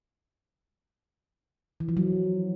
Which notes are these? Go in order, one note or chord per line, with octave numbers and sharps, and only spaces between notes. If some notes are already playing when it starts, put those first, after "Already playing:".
E3
F3
F#3